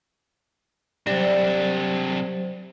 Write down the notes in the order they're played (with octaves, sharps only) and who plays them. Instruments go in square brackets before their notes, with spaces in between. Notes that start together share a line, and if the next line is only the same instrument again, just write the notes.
[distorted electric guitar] C3 D4 [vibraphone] F#3 C5 [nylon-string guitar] G3